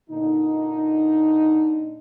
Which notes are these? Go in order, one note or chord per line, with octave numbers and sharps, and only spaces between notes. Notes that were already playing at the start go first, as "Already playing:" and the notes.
A#2 D3 D#4